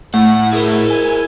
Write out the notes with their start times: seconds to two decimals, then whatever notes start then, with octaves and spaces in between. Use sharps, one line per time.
0.14 A2 A3 F#5
0.53 E4 G#4 A#4
0.90 G#5